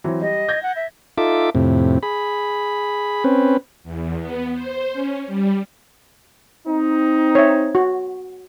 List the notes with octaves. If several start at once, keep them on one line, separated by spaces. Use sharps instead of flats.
E3 F#3 C4
G3 D#5
G6 G#6 A#6
F#5
E5
D#4 F4 A4 E5 D6
F2 A2 C3
G#4 B5
C4 C#4 B4
E2
B3
C5
C#4
G3
C4 D#4
C#5 E5
F#4